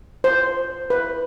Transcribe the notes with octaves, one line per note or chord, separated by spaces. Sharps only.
C5
B4